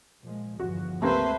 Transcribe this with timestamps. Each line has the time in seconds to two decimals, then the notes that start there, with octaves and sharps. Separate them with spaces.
0.21 A#2 F3 G#3
0.60 G1 E2 F3 F#4
1.02 C#2 C3 A3 A#3 C4 B4 C5